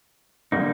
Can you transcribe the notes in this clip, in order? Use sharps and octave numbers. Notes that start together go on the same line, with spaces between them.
D3 G3 A#3 D#4